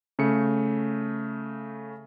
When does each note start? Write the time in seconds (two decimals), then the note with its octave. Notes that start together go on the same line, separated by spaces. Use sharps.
0.19 C#3 A3 C#7